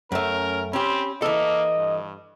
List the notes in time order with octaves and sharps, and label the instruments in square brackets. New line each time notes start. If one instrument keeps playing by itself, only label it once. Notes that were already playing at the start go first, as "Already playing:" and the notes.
[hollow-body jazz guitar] F#2 A3 [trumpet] C#4 [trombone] A#4
[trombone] C4 [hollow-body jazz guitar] C#4 G4 [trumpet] B5
[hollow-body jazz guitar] E3 A4 [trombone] A#3 [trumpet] D#5
[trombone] G2